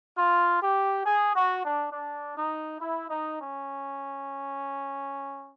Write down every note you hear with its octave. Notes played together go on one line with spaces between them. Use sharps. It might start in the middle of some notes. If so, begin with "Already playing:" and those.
F4
G4
G#4
F#4
D4
D4
D#4
E4
D#4
C#4